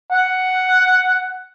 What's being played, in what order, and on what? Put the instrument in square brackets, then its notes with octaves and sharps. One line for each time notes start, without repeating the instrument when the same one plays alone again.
[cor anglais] F#5